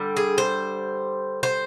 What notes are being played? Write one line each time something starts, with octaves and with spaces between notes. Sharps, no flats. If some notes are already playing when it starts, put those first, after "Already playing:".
Already playing: D3 G3
G#4
C5
C5